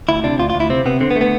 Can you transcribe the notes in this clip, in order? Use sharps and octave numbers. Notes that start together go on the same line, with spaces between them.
D2 E4
C3 D4
D2 F4
F4
D2
E4
C3 C4
C3 B3
D3 C4
B3
A3
B3